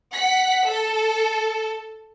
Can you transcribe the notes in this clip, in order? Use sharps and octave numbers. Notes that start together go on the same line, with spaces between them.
F#5 B6
A4